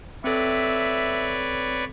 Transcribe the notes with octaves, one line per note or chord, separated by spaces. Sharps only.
C4 A4 B4 C#5 D5 E5